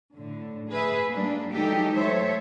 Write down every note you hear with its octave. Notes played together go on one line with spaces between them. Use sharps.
A2 D3
G#4 B4 E5
G3 A#3 D4
E3 F#3 G#3 D#4 G4 A4
A3 A4 C5 C#5 E5